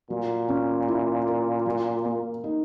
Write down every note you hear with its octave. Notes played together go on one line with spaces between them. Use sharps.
A#2 F#3
C#4
E4
A#4
F#3
A#3
D#4